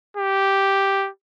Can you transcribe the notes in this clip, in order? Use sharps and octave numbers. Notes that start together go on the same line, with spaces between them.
G4